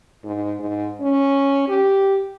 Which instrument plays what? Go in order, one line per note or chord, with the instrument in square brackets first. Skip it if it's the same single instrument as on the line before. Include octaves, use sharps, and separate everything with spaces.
[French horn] G#2
G#2
C#4
G4